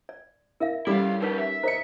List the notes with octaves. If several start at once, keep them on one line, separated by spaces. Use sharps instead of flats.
D5
E4 A#4 E5 F5
G3 C#4 E4 A4 F5 D6
F3 D#4 G4 A#4 B4
E5
A#4 C5 D#5 C#7